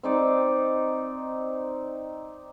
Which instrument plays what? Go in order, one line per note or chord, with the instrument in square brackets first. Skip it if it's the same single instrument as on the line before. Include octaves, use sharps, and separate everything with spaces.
[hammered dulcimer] C4 D#4 D5